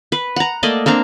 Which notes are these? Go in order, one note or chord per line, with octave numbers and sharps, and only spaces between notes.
B4
F#5 A#5
A3 A#3 D5 D#5
A#3 C4 D4 A#5